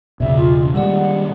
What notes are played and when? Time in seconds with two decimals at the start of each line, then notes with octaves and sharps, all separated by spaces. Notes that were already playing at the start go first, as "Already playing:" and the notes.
0.20 B1 E2 A#2 C#3 E5
0.36 F4
0.61 E1
0.74 A#2 D#3 G3 G#3 G4 D5 F#5